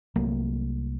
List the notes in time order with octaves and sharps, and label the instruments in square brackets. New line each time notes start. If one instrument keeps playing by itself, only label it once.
[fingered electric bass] C2 F#3 A3 A#3